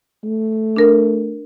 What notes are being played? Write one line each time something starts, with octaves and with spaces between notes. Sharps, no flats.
A3
D4 A#4